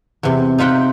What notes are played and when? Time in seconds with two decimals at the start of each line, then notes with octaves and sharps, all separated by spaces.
0.23 E2 C3
0.58 D#4 F4 E5 F#5 G5